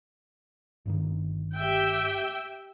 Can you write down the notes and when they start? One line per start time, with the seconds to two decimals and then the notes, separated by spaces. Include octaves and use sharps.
0.86 G1 G2 D#3
1.56 G4 E5 G5